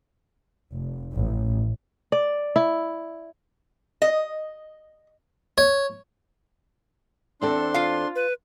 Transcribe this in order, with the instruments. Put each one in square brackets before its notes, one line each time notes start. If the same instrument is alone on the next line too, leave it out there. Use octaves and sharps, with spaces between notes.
[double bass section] F1
A1
[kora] D5
E4
[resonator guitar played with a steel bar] D#5
[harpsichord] C#5
[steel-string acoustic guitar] E2 C4 A4 [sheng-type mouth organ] D4 C6
[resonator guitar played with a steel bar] F4 F5
[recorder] B4